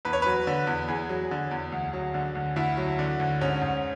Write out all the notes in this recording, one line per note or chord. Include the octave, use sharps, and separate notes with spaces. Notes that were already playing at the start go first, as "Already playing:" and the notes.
E2 B4
C#5
F#3 B4
D3
E2
E2 G#4
F#3
D3
E2
D2
F#3
D3
D2
D2 E4
F#3
D3
D2
G#2 C#4
G#2